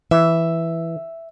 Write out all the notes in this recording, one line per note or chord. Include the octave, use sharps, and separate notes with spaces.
E3 E5